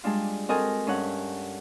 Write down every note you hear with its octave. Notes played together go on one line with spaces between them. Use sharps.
G3 G#3 D4 F4
C4 F#4 A4 A#4 D#5 G#5
G2 C#4 G4 F#5